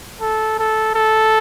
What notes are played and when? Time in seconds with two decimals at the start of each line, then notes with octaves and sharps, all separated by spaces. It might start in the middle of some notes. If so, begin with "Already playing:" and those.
0.21 A4
0.59 A4
0.95 A4